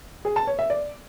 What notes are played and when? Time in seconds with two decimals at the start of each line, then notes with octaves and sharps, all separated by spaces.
0.25 G#4
0.36 A5
0.47 C#5
0.59 E5
0.70 D5